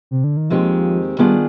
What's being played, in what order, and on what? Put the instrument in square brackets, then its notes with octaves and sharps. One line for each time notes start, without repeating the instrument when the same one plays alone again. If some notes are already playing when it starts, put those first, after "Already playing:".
[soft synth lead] C3
D3
D#3
[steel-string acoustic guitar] D#2 D#3 G#3 C4 G4 [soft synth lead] F3
[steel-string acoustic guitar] D#3 B3 D4 F4 G#4 [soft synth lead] G3